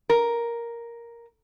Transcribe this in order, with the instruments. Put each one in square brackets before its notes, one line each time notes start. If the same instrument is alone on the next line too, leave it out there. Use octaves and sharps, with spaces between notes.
[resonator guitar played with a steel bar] A#4